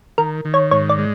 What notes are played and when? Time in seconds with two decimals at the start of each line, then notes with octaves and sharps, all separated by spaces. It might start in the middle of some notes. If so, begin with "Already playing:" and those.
0.18 D#3 A#4
0.45 D#3
0.54 C#5
0.71 G#2 C#5
0.89 D5
0.98 G#3